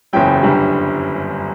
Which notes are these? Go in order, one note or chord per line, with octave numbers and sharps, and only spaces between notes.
F#1 E2 C#3 F#3 G5
G1 F#2 D3 G3